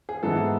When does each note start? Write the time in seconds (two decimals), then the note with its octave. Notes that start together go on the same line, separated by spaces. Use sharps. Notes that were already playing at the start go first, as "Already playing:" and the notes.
0.09 G#4
0.23 G#2 E3 G#3 B3 E4 A4